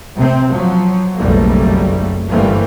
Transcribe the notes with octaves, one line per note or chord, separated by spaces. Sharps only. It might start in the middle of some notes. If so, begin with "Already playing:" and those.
C3 C4
F3 F#3
F#1 B1 F2 G3 A3 A#3
G1 E3 G3 A3 A#3 C4